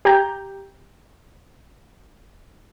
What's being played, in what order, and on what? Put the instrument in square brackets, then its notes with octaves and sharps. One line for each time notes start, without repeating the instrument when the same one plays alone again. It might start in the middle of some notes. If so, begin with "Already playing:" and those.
[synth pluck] G4 A#5 G6